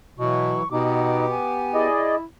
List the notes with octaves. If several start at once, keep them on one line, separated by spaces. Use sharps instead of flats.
B2 E3 F#3 E4 C#6
B2 B3 D#4 G4 D6
G#5
E4 G#4 D5 D#5